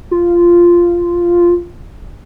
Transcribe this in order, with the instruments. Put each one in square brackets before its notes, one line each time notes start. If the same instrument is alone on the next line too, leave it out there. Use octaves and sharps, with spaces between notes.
[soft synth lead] F4